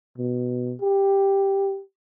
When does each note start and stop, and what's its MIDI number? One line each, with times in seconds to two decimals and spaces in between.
0.18 0.74 47
0.81 1.81 67